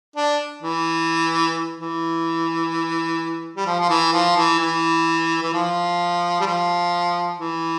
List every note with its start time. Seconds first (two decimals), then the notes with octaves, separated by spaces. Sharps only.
0.16 D4
0.63 E3
1.80 E3
3.56 G3
3.66 F3
3.80 F3
3.89 E3
4.13 F3
4.36 E3
4.59 E3
5.42 E3
5.53 F3
6.40 G3
6.46 F3
7.40 E3